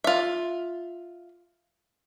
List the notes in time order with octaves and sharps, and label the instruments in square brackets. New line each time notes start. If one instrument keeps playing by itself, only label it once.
[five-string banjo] F4 E5